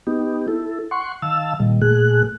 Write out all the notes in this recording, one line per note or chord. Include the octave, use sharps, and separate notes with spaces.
B3 D#4 G4
E4 A4
F#5 C6 C#6
D#3 F5 A5 E6
A#2 D#3 G3
A#2 A3 G#4 F#6